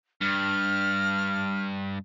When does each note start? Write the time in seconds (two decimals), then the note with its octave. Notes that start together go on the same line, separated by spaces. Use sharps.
0.21 G2 F6